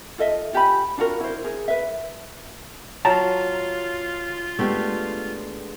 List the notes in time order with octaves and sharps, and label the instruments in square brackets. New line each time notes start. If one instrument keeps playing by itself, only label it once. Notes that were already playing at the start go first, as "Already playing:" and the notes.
[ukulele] F4 A4 D#5 E5
F4 G4 G#5 B5
D4 F4 F#4 A#4
E4 C5
G#4 A#4
B4 E5
[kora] F#3 [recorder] F4 [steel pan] A5 A#5
[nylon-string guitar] G#3 B3 D4 [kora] A3 G4